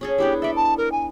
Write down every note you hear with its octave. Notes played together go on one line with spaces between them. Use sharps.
C#4 G#4 A4
B3 D4 E4 G4
A4 D5 E5
A5
A#4
G#5